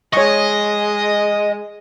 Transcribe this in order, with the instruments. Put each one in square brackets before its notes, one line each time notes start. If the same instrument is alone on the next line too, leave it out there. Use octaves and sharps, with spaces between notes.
[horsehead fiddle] G#3 [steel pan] C#5 C#6 [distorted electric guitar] D#5